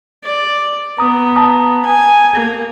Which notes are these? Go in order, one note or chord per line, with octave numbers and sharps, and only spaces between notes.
D5
B3 A#5 D#6
A5 A#5 D#6
G#5
A#3